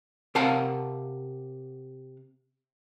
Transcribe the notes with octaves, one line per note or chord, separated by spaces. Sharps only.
C3 A#4 F5 F#5 A5